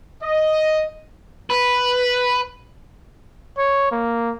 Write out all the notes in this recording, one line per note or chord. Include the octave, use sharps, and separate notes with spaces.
D#5
B4
C#5
A#3